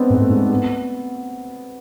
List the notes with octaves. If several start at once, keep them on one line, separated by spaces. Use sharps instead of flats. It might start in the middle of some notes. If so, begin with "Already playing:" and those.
Already playing: G#3 B3 C4 D4
G#2
A3
G#2
B3